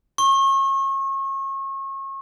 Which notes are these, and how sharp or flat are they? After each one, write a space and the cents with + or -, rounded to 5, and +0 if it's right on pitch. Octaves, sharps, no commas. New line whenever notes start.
C#6 -35